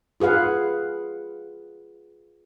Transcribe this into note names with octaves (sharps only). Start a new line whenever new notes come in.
F4 G#4 B4 F5 F#5